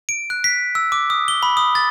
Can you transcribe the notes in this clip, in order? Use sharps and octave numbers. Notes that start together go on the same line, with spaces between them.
D7
F#6
B6
E6
D6
D#6
G7
B5
D#6
A6